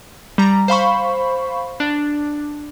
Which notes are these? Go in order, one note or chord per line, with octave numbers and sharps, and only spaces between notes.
G3 A#5
C5 F5 B5 C#6
D4